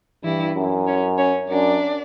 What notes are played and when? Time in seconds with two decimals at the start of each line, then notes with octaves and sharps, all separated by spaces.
0.24 G2 E3 E4
0.56 F#2
0.87 C#4 C#5
1.18 C#4 C#5
1.50 F#2 D4 D5